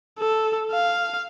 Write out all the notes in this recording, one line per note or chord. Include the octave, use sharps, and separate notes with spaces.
A4
F5